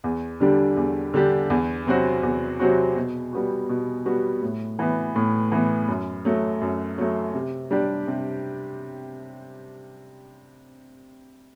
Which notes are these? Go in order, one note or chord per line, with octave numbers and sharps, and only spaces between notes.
E2
D3 G3 D4 G4
E2
D3 G3 D4 G4
E2
C3 F#3 C4 F#4
E2
C3 F#3 C4 F#4
B2
G3 B3 F#4
B2
G3 B3 F#4
A2
E3 B3
A2
E3 B3
F#2
F#3 A3
F#2
F#3 A3
C3
G3 D4 G4
C3